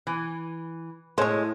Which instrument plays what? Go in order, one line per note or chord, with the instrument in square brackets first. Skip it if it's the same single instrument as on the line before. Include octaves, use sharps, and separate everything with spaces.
[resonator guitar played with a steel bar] E3
[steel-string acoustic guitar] A2 [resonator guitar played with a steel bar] G#3 [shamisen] C5 C#5